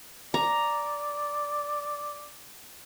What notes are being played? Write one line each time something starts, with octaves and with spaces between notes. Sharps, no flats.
D5 A#5